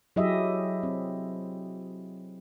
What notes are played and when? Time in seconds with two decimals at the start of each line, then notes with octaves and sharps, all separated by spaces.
0.16 F#3 E4 G4 G#4 D#5 E5
0.83 C4